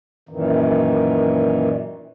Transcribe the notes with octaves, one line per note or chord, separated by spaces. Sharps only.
F#2 A#2 D#3 E3